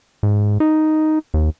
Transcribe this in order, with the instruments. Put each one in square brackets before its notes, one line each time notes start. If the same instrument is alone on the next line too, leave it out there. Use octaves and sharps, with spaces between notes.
[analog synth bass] G#2
D#4
D#2